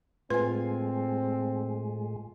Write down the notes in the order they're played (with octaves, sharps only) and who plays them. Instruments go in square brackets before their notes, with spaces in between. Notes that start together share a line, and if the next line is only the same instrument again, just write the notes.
[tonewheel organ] A2 G#3 [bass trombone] C4 [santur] F4 G#5 [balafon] B4